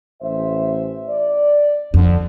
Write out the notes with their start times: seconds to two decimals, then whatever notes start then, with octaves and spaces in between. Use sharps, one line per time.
0.22 A1 C5 E5
1.09 D5
1.94 F2 D3